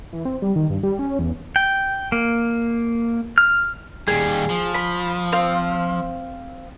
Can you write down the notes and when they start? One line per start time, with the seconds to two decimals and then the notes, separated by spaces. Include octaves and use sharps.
0.13 E3
0.25 C4
0.42 G3
0.56 D#3
0.70 G2
0.83 G3
0.99 C#4
1.19 E2
1.56 G5
2.12 A#3
3.38 F6
4.08 D#2 G3 G#4
4.50 F3
4.74 B5
5.32 C4 F5